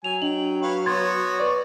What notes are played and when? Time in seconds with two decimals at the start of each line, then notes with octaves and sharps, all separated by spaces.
0.04 F#3 G#5 F7
0.22 D4 D#5 G5 F#7
0.63 B4 C#5 F5
0.86 B3 F#4 C#5 C6 G#6 A6
1.39 B4 D5 C#6